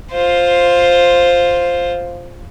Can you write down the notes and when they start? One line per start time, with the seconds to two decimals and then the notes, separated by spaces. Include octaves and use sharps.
0.12 F4 C5